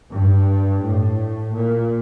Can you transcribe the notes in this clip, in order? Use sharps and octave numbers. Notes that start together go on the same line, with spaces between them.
G2
A2
A#2